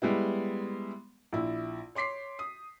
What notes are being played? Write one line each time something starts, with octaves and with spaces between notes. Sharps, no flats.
G3 G#3 B3 E4
A#1 E4
C#5 C6 D6 B6 C7
D#6